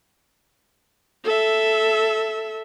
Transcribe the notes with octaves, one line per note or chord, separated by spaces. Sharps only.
A4 E5